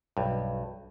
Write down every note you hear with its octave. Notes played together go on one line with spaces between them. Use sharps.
B1 G2